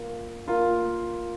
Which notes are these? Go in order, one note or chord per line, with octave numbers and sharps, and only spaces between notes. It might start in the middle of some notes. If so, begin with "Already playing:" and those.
Already playing: A#3 F4 A#4 F5
A#3 F4 A#4 F5